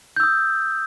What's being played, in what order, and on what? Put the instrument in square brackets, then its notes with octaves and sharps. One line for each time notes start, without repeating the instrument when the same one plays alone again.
[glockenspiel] G6
E6
D#6